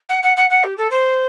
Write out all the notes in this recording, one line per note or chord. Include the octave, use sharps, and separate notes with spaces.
F#5
F#5
F#5
F#5
G4
A4
C5